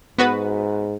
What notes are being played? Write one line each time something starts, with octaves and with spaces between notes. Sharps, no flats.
G#2 B3 F#4 B4